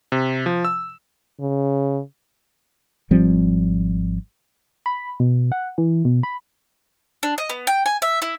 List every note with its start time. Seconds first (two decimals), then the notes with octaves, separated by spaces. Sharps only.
0.12 C3
0.46 F3
0.65 E6
1.40 C#3
3.11 G#1 F3 G3 C4
4.86 B5
5.20 B2
5.52 F#5
5.78 E3
6.05 B2
6.23 B5
7.23 D4
7.38 D#5
7.49 B3
7.67 G5
7.86 G#5
8.02 E5
8.22 E4